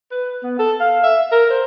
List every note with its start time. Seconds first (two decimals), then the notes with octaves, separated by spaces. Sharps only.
0.11 B4
0.43 B3
0.59 A4
0.80 F5
1.03 E5
1.32 A#4
1.50 C5